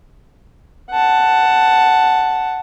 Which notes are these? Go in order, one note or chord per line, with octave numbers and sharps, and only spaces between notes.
F#5 A5